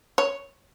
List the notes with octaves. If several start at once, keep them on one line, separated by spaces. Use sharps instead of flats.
C#5